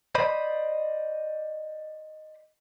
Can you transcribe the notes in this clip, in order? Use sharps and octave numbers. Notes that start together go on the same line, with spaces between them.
C5 D5 D#5 B5